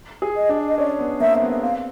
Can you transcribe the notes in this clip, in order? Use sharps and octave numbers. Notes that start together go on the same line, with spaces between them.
G#4
D#5
D4
D#5
C#4 D5
B3
A#3 E5
C4
B3
C4 F5